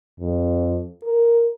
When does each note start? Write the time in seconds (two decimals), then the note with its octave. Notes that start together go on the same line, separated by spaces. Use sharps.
0.20 F2
1.04 A#4